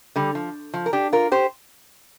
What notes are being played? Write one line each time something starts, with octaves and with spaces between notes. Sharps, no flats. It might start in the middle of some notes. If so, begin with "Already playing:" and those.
D3 G3
F3
F3
A#4
D4 G4
F4 A#4
G4 C5